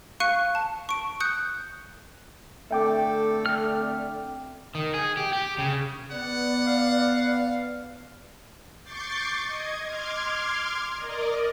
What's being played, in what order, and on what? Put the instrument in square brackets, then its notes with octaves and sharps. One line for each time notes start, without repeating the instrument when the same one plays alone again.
[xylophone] F5 C#6 F#6 C#7 D#7
A5
C#6 D7
D#6 F#6 G6 C#7
[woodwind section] D3 A3 C4 [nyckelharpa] A4 [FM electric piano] E5 G5 D6
[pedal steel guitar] F6
[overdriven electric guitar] D#3
G#4
G4
G4
C#3
[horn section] B3 [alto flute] D5 [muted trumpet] F#5
[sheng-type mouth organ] F5
[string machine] C#6 D6 G6 A6 C7
D#5 G#6
C6 D6 F6 G#6
A#4 D5 D#5